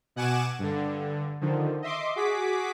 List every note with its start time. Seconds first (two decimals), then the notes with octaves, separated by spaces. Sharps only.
0.16 B2 F#5 G#5 D6 E7
0.59 G2 D3
1.41 D3 D#3 F3
1.82 D#5 E5 C6 D6
2.16 F#4 G#4 D6 B6